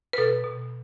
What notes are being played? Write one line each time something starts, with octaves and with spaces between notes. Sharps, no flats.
B4
B2 A4
B2